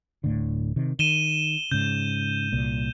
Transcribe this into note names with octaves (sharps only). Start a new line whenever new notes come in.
D1 A2 D3
C3 D#3
D#3 D#7 E7 G7
G#2 C#3 G6
C2 A#2